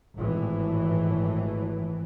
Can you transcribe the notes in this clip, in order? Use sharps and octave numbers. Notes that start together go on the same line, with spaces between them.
G#1 A2 E3